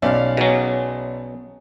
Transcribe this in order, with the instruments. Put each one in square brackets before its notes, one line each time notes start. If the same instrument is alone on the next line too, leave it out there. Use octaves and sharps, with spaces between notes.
[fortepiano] B1 D5 [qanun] C#4 F5
[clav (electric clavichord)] B2 F#3 [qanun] G#4